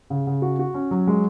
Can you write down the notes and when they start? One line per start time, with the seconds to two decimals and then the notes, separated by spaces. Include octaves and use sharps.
0.10 C#3
0.27 C#3
0.42 F#4
0.59 F#4
0.74 C#4
0.91 F#3
1.07 G#3